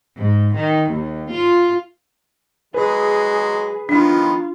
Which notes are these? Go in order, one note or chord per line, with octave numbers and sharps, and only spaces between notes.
G#2
D#3
D#2
F4
F#3 G#3 G#4 B4
D#3 F3 B3 D4 F4